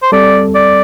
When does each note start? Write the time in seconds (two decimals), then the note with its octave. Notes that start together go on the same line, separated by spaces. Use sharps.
0.02 C5
0.12 G3 C4 A4 D5
0.55 D5